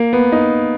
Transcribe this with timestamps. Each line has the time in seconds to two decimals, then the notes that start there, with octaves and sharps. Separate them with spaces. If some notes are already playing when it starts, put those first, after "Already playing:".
Already playing: A#3
0.13 B3
0.32 D#4